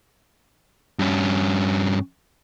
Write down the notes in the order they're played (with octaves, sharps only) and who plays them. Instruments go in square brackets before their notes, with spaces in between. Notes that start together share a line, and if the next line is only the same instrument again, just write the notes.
[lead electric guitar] G2 C#4